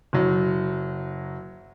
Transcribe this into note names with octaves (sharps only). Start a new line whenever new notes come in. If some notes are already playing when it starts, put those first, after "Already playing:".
F#1 F#3